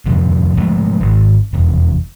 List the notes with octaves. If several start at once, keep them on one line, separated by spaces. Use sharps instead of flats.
C2 F2 A#2
C#3 F3 G#3 A3
G#1
F1 E2